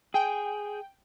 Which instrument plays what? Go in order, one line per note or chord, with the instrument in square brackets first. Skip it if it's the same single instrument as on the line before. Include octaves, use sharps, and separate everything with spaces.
[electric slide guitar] G#4 [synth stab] G5